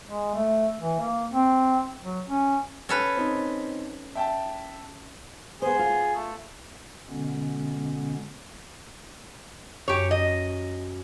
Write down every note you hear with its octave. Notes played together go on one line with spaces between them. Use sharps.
G#3
A3
E3
A#3
C4
F#3
C#4
C#4 A4 B4
C4 D#4
E5 G5 A5
B3 G#4 C5
F4
A3
B2 D3 G#3 B3 C#4
F#2 G4 C#5
D#5